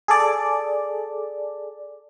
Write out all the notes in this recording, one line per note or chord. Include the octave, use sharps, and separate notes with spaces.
G#4 A4 D5